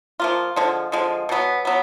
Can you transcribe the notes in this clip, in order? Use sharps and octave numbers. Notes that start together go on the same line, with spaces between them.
F3 A#3 F4
D3 F3 G#3
D3 F3 G#3
B2 F#3 B3
F#3 B3